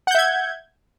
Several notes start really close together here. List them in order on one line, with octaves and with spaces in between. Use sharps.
F#5 G6 E5 G#6